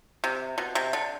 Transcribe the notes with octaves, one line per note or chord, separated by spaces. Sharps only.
C3
B2
C3
D3